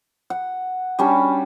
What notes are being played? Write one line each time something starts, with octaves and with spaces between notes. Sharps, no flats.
F#5
G3 C#4 D4 F#4